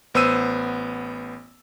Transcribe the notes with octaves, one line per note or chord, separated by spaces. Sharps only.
A1 B3 C5 E6 D#7